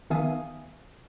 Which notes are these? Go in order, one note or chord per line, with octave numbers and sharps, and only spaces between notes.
D#3 B3 E5 F5 G#5 D#6